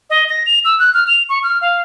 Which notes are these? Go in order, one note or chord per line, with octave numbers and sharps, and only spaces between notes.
D#5
A#6
F7
E6
F#6
F6
F7
C#6
F6
F5